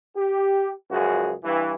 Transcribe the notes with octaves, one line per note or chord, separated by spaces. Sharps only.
G4
C#2 F#2 F3 F#4 G#4
G2 E3